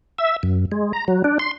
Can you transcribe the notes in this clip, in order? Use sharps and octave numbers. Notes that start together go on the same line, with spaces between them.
E5
F#2
G#3
A#5
F#3
D4
C6